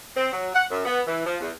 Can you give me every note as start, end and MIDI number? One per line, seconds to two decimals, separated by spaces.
0.16 0.30 60
0.32 0.48 54
0.54 0.65 78
0.70 0.85 42
0.85 1.01 59
1.07 1.25 52
1.26 1.36 53
1.40 1.51 40